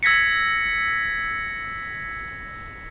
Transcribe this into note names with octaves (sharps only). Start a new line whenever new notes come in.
E6 G#6 A#6 B6 C#7